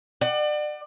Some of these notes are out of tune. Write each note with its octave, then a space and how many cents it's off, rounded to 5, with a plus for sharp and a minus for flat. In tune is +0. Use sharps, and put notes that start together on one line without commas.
D5 +35 F#5 +15